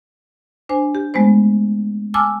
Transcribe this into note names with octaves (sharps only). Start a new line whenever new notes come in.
D4 C5 G#5
G4
G#3 A3 B3 C5
G#5 A5 D6 E6 F6